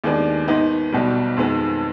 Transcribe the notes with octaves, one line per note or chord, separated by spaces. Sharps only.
D#2 D#3 G#3 B3 D4
G#2 D#3 B3 D#4
B1 B2 G3
F2 D#3 G#3 B3